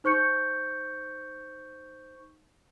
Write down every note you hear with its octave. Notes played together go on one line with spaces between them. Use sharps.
D#4 C5 C#6 G6 C#7